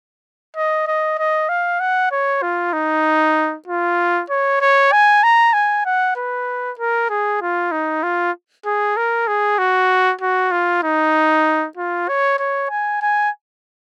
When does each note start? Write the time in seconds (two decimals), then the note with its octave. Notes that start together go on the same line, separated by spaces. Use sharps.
0.56 D#5
0.87 D#5
1.18 D#5
1.49 F5
1.80 F#5
2.12 C#5
2.42 F4
2.73 D#4
3.67 F4
4.30 C#5
4.61 C#5
4.92 G#5
5.23 A#5
5.53 G#5
5.85 F#5
6.16 B4
6.79 A#4
7.09 G#4
7.42 F4
7.72 D#4
8.03 F4
8.65 G#4
8.97 A#4
9.27 G#4
9.58 F#4
10.21 F#4
10.52 F4
10.83 D#4
11.77 F4
12.08 C#5
12.39 C#5
12.70 G#5
13.02 G#5